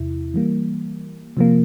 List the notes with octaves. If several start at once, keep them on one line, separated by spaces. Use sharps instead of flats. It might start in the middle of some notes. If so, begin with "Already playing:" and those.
Already playing: E2 C3 E4
E3 G3 A#3
C3 F3 A#3